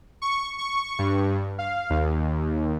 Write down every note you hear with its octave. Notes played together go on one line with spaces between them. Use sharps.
C#6
C#6
G2
F5
D#2